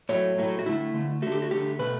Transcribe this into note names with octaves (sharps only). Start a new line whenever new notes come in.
A2 F#3 A3 C#5
A2 F#3 A3
F#4
D3 A3 E4
D3 A3
D3 A3 F#4 G4
F#4
D3 A3 G4
B2 A3 B4